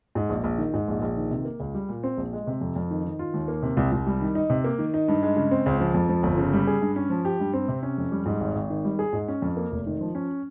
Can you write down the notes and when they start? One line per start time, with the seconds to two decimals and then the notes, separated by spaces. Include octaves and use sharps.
0.15 G#2
0.30 A#1
0.44 A#1
0.58 D#3
0.74 G#2
0.88 A#1
1.02 A#1
1.16 D#3
1.31 C3
1.45 A#3
1.60 C#2
1.74 G3
1.89 A#2
2.03 C4
2.17 A#1
2.33 G#3
2.47 C3
2.61 F2
2.76 F2
2.91 D#3
3.05 D#3
3.19 F4
3.34 D#2
3.48 A#3
3.63 C3
3.77 C2
3.92 C2
4.07 G3
4.21 D#3
4.35 D#4
4.50 C3
4.64 A#3
4.78 D#3
4.94 D#4
5.08 G2
5.23 G#3
5.36 C#3
5.51 C4
5.66 C#2
5.80 F3
5.94 F2
6.09 F3
6.23 G1
6.38 C#3
6.53 G3
6.67 G#4
6.82 G2
6.96 C#4
7.10 F3
7.25 G4
7.40 G2
7.54 C4
7.68 C3
7.83 C#4
7.98 F2
8.11 G3
8.26 G#2
8.40 G#1
8.55 G#1
8.70 D#3
8.84 G3
8.99 G#4
9.13 G#2
9.28 C#4
9.42 F2
9.57 A#3
9.72 F1
9.86 D#3
10.01 F3
10.15 C#4